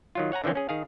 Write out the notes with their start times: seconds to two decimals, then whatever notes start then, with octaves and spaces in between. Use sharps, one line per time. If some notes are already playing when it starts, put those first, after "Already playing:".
0.15 D#3 F#3 F4
0.32 C#5 F#5 G#5 A#5
0.44 D3 E3 F3 C4 C#4
0.55 C#4 G#4
0.69 D#3 G#4 F5